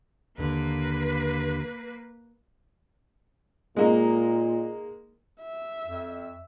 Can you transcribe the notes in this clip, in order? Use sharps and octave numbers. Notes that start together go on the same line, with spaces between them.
D#2 D3 A#3 B4
A#2 G#3 A#3 D#4
E5
F2